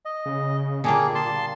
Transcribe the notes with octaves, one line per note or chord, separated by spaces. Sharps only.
D#5
C#3
A#2 D3 G3 A#3 G#4
A5 C6